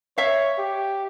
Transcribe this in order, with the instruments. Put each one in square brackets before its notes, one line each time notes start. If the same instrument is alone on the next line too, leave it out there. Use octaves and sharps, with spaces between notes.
[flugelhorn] C#5 [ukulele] E5 F5
[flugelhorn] G4